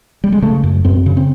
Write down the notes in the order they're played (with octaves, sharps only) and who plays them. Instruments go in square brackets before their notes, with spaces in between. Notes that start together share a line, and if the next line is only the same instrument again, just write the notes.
[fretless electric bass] G3
G#3
C#3 A3
F#2
F#2 C4
C#3
C4